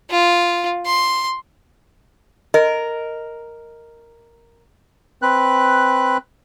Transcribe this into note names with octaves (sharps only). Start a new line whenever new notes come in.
F4
C6
A#4 D#5
C4 B4 F#6